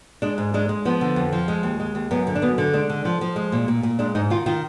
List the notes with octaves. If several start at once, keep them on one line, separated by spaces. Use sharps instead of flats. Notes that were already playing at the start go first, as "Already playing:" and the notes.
G#3 D4
G#2
G#3 D4
G#3
F3 B3
D3
F2
F3
G#3
D#2
G#3
D#2
F#2 B3
D3
D4
F#2 B3
D3
G#3 D4
D3
F3
F3
G#3
A#2
A#2
A#2
G#3 D4
G#2 D#4
D#3 F4
D#3 F4